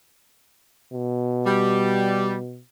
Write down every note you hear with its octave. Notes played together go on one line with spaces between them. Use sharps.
B2
G3